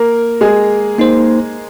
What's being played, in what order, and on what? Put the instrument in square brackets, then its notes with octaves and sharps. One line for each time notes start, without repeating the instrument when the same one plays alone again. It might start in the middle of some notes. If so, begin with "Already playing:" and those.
Already playing: [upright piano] A#3 A#4
G#3 G#4
[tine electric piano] A#3 D#4 C5